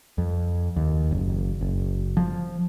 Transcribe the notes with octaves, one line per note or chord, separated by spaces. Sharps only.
F2
D#2
F#1
F#1
F3